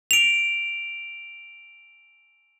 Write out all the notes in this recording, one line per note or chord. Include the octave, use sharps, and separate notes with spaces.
D7 F7